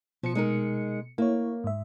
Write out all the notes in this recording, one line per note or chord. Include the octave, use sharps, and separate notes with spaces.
B2 F3 C#7
G#3 D#4 A#4
A#3 E4 C#5
G#2 E5